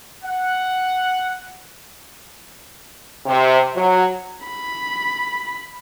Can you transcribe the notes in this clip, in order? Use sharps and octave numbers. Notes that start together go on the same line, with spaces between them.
F#5
C3
F#3
B5